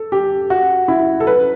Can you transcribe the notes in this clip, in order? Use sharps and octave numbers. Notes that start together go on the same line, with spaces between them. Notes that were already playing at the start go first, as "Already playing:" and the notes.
Already playing: A4
G4
F#4
E4
A4
B4